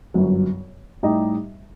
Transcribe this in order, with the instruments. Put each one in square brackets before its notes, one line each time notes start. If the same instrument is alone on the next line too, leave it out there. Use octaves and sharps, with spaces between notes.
[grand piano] G1 F#2 F#3
A2 G3 D#4 G4 D#5